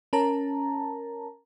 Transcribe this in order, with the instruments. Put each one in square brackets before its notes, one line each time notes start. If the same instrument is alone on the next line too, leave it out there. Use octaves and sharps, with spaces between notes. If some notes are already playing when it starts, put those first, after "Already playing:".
[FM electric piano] C#4 A#4 A5 A#5